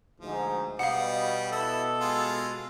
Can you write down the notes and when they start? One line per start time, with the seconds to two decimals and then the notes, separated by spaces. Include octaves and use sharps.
0.21 D2 G#2 F3
0.79 B2 G3 B3 D#5 F5 F#5
1.52 E4 A4
2.01 G#3 F4